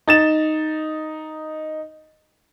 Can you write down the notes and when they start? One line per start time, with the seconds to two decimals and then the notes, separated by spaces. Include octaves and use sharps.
0.08 D#4 A6 E7